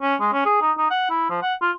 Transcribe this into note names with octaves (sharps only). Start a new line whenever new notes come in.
C#4
G#3
C#4
G#4
D#4
D#4
F#5
E4
F3
F#5
F4